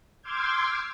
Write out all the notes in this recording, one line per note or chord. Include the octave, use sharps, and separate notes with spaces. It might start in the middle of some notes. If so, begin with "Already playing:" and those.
C6 D6 E6 F6 G6 G#6